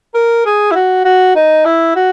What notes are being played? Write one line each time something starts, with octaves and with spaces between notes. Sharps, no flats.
A#4
G#4
E4
F#4
F#4
D#4
E4
F#4